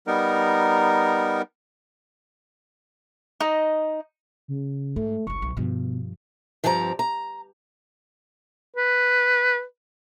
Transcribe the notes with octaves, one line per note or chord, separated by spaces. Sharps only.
G3 B3 D#4 A#4
D#4 D#5
C#3
G#2 A3
F#1 C2 C#6
B1
G2 B2 F3
G2 F3 C4 G4 G#4 A#5
A#5
B4